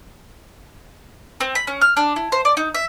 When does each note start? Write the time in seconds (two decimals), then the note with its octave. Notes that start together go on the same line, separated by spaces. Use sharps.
1.41 C4
1.55 B5
1.67 C#4
1.81 F6
1.97 D4
2.16 E4
2.32 C5
2.45 D5
2.57 D#4
2.74 E5